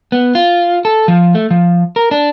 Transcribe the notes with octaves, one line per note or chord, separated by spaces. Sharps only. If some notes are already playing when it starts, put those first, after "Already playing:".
B3
F4
A4
F3
A3
F3
A#4
D4